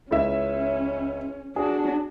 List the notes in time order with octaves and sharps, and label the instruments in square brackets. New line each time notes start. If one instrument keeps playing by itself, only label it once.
[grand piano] C#2 E4 E5 [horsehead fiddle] C#4
[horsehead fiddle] D4 F#4 [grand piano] G#4